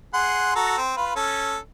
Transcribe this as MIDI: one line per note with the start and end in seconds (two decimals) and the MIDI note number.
0.14 0.55 68
0.14 0.55 78
0.14 0.55 84
0.56 0.77 66
0.56 0.77 69
0.56 0.77 82
0.78 0.93 60
0.97 1.14 65
0.97 1.14 71
1.16 1.58 61
1.16 1.58 69